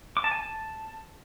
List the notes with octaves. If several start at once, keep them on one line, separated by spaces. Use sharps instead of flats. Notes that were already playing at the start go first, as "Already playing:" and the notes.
D6
A5
G#5
A5